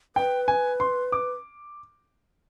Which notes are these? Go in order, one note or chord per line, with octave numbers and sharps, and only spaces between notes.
B4 G5
G#5
C6
D6